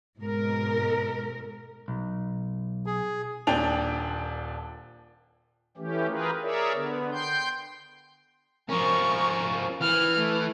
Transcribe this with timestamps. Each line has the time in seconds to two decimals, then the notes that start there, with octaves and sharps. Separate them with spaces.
0.19 G#2 B2 G#3 A#4
1.88 B1
2.86 G#4
3.47 D#1 A#2 D4 G5 G#5 F7
5.77 E3 A3 C#4 G4
6.09 F4 G4 G#4 A#4 B4
6.42 G#4 A#4 C#5 D5 E5
6.73 D3 B3
7.13 G5 C6 G6
8.69 F3 C#4 A#4 C#6
9.82 E3 F6
10.18 A3